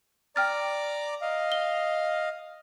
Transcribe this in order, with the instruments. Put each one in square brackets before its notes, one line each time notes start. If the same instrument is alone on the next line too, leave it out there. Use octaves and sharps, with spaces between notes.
[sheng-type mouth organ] D5 A#5 D6 [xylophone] G5 F6 A6
[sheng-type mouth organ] D#5 F5
[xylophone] G7